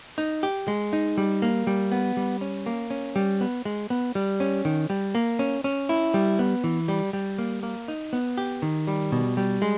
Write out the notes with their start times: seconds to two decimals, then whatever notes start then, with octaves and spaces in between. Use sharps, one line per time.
0.18 D#4
0.43 G4
0.68 G#3
0.93 D#4
1.18 G3
1.42 A#3
1.67 G3
1.92 B3
2.17 G3
2.41 C#4
2.66 A#3
2.91 C#4
3.16 G3
3.41 B3
3.65 G#3
3.90 B3
4.15 G3
4.40 C#4
4.65 D#3
4.90 G3
5.15 A#3
5.39 C#4
5.64 C#4
5.89 E4
6.14 G3
6.39 B3
6.64 E3
6.88 G3
7.13 G3
7.39 A#3
7.63 A#3
7.88 D#4
8.13 B3
8.38 G4
8.62 D#3
8.87 G3
9.12 B2
9.37 G3
9.62 G#3